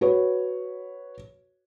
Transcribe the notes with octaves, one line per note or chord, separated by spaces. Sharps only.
F#4 B4 C#5